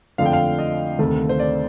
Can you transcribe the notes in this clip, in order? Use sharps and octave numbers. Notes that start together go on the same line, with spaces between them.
F2 D3 F3 A3 F5
G5
F5
D#5
D2 C3 D#3 A3
C5
D5